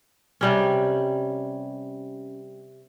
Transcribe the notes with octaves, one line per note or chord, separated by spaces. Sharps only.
C3 G3 C#4